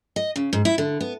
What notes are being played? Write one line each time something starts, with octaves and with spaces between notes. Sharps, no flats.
D#5
C#3
G#2
E4
D3
B3